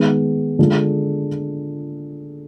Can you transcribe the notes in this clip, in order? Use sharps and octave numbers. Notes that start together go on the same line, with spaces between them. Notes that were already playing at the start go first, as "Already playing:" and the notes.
Already playing: D#3 G#3 B3
D3 G#3 D4 F4